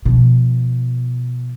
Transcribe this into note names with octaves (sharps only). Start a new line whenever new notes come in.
B2 F3